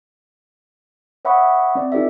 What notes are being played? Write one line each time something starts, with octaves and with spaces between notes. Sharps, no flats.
C#5 E5 F#5 B5 C#6 D#6
C4 D5
D#4 F4 G#4 A#4 D5 E5